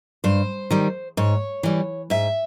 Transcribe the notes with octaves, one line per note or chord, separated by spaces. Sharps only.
G2 C5
D#3 G3
G#2 C#5
E3 G3
G#2 E5